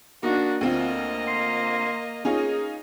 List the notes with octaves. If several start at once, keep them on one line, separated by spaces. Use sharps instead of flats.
A#3 D4 D#4 F#4
D2 A#3 C4 F4 D#5
C6
C#4 D#4 F4 G#4